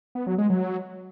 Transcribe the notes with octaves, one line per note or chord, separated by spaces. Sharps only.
B3
F#3
G#3
F#3